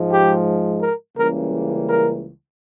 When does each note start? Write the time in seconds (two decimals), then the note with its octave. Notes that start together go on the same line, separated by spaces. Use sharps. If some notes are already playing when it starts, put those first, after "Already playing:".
Already playing: G#2 F3 G#3
0.12 G4
0.81 A#4
1.17 C#2 C#3 E3 G3 A#3 A#4
1.88 A#4